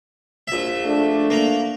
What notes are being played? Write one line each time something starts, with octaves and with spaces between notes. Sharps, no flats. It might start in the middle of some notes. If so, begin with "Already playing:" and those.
A#1 E5
A3 D4
A#3 A#5